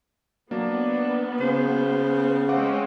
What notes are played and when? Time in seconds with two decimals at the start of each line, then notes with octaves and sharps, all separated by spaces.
0.51 F#3 A#3 B3 D4
1.41 C#3 C5
2.49 G#3 C4 C#4 F5 F#5 D6